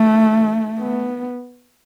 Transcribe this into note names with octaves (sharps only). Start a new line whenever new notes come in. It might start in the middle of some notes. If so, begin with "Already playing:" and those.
Already playing: A3
B3